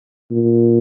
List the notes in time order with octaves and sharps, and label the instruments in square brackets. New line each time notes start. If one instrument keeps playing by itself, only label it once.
[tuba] A#2